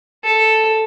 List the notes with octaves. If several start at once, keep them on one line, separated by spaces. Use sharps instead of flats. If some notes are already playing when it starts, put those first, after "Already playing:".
A4